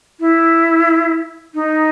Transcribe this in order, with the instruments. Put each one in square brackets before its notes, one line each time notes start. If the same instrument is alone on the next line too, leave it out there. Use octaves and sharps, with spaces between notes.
[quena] E4
D#4